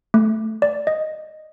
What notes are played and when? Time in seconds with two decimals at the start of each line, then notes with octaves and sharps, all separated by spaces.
0.14 A3
0.62 D5
0.87 D#5